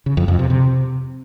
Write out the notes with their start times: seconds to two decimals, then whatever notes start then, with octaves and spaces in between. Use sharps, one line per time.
0.06 C#3
0.17 F2
0.28 F2
0.39 C3
0.50 C3